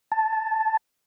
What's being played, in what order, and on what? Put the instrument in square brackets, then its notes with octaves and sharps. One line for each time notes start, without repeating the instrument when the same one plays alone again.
[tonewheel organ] A5